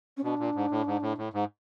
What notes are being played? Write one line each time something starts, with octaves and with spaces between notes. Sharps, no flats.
C#4
B2 D4
A#2
G#2
A2
G#2
A2
A2
G#2